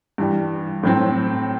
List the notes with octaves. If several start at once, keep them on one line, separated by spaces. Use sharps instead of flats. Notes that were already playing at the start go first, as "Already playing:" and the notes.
G2 E3 G3
A2 F#3 C4